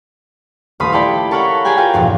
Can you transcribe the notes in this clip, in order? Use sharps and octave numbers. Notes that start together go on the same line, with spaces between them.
D#1 A3 F5 B5 C6 D#6
E4 G4 A4 D5 B5
A4 A#4 C#5 F5 F#5 B5
G4 G#4 A#4 G5 G#5
F4 F#4 A#4 F5 G5
F1 E2 G2 A#2